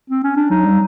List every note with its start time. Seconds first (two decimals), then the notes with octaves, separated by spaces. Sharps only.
0.10 C4
0.24 C#4
0.36 D4
0.50 F#3 D#4
0.65 G3